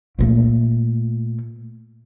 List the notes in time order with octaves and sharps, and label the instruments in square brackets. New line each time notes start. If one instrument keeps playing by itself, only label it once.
[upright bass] A#2 A3